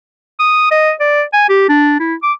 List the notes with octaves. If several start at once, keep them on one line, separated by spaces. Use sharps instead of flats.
D#6
D#5
D5
G#5
G4
D4
E4
D6